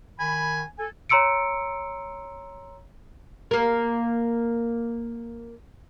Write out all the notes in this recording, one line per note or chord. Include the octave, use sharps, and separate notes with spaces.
D#3 G#5 B5
A4 G#5
C#5 A#5 C6 E6 C#7 D7
A#3 A#4